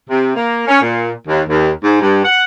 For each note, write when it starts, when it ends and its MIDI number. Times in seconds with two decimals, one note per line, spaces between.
0.09 0.32 48
0.36 0.66 58
0.68 0.80 61
0.81 1.12 46
1.28 1.41 39
1.48 1.70 39
1.83 2.01 44
2.02 2.22 43
2.25 2.43 78